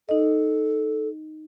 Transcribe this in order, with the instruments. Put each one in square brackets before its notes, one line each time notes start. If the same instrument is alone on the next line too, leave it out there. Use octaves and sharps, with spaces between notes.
[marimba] D#4 D#5 [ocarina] A4